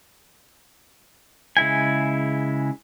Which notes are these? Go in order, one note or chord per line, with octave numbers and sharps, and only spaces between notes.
C#3 G#3 E4 G#5